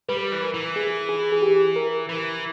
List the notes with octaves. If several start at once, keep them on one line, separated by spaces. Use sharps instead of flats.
G3 B4
E3
A#4
E3
G#4
G#4
G#4
G4
A#4
E3